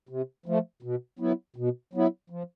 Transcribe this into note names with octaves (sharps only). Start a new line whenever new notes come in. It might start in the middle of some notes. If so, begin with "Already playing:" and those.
C3
F3 A3
B2
F#3 B3 E4
B2
F#3 B3 E4
F3